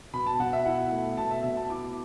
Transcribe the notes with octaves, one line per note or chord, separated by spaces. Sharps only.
B2 B5
A5
B2 F#5
E5
E4 F#5
A3
B2 A5
E5
B2 E5
A5
E4 D6